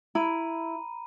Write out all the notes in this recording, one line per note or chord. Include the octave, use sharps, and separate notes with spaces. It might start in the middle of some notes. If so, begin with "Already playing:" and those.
E4 A#5 B5 D#7